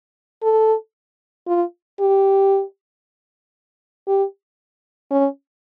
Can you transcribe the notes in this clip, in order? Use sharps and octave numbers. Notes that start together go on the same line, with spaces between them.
A4
F4
G4
G4
C#4